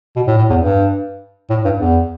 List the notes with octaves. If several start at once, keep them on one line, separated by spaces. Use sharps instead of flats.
B2
A2
A2
E2
G2
A2
G2
E2